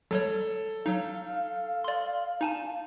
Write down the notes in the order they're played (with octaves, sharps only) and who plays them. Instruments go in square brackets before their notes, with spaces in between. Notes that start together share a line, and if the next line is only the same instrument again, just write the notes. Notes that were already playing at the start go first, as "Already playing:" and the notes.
[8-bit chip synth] F#3 G3 C#5 [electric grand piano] A4
[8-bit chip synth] F#3 D#4 [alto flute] F5
[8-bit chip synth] D5 C6
D#4 G#5 A5